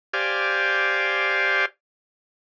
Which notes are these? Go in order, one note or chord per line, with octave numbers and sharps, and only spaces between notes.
G4 C5 D5 F5 G#5